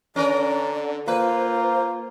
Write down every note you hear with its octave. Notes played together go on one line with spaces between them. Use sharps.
D3 C#4 A#4 B4 D5
A#3 F4 B4 C5